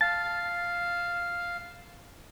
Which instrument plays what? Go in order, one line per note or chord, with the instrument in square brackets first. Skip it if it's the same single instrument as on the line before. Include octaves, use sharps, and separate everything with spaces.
[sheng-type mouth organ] F5 [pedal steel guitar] A5